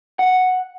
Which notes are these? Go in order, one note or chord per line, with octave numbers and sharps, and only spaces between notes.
F#5